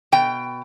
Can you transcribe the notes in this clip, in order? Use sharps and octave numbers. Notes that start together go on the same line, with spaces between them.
B2 G5